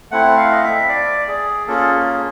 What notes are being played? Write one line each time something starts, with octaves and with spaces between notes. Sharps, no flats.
A3 C4 E4 F#5
F5
D#5
E5
D5
G#4
A#3 C#4 F4 G#4 A4
G#4